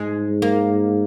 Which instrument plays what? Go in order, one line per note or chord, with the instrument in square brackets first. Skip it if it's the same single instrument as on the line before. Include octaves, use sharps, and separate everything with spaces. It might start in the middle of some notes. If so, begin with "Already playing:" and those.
Already playing: [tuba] G#2 [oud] G#3
[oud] A#3